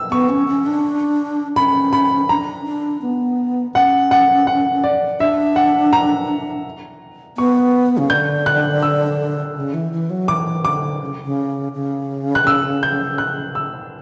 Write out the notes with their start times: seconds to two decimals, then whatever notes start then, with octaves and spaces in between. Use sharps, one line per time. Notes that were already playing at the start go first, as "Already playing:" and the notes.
Already playing: E6
0.11 B3 C#6
0.29 C#4
0.48 C#4
0.66 D4
1.56 C#4 B5
1.93 B5
2.29 D4 A#5
2.65 D4
3.02 B3
3.75 C#4 F#5
4.11 F#5
4.47 F#5
4.84 D5
5.20 D4 E5
5.56 F#5
5.93 A#5
7.37 B3 C#6
7.98 C#3
8.10 D3 G6
8.46 F#6
8.82 E6
9.56 C#3
9.74 E3
9.92 E3
10.10 F#3
10.28 E3 D6
10.64 D3 D6
11.01 C#3
11.25 C#3
11.74 C#3
12.35 F#6
12.47 E6
12.83 G6
13.18 F#6
13.55 E6